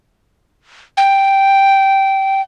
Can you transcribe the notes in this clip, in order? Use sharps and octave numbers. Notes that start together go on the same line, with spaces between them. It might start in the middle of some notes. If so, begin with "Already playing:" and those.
G5